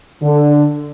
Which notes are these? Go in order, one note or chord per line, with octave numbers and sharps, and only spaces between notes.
D3